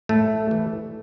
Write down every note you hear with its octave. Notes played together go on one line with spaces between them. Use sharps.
A2 A3
E3